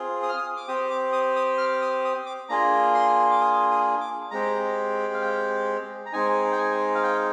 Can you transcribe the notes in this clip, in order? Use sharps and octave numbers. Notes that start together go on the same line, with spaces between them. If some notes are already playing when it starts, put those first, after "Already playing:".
Already playing: C4 F4 G#4
D#6
F6
D#6
D6
C4 G4 D#6
D6
D#6
D#6
F6
D#6
D#6
D6
A#3 D4 F4 G#4 A#5
C6
D6
D#6
D#6
D6
G#3 C4 G4 A#5
F5
G5
A#5
G#3 C4 D#4 G#5
G5
G#5
F5
G5